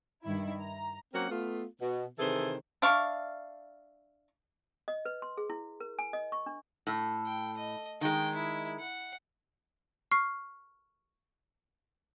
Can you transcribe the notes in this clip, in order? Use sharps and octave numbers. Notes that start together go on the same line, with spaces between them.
G2 D#3 E4
A#5
F#3 A#3 C4 C#4 A#4 F#5
A3 B3 F4
B2
C3 D#3 E3 G#4 A4 C5
D4 E4 F5 C#6
D#5
B4
C6
G#4
E4
A#4
G#5
D#5
C#6
D4
A2
G5
D#5
D#3 G#3 G5
E4
F#5
C#6 F6 C7